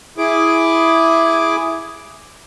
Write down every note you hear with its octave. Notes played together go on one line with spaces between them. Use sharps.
E4 G#4 D6